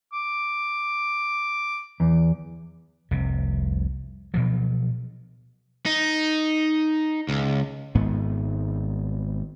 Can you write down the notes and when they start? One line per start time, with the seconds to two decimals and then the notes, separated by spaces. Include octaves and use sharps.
0.13 D6
2.00 E2
3.11 F1 C2 C3
4.34 B2 F3 F#3
5.86 D#4
7.29 C#2
7.95 G#1 G#2 B3